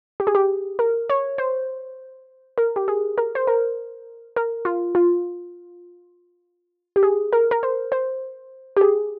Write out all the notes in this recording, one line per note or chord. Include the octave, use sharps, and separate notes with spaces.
G4
G#4
G4
A#4
C#5
C5
A#4
G4
G#4
A#4
C5
A#4
A#4
F4
F4
G4
G#4
A#4
A#4
C5
C5
G4
G#4